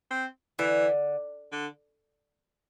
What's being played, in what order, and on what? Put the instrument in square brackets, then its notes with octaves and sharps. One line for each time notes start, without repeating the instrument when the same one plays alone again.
[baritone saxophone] C4
[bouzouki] D3 [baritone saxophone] E3
[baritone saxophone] D3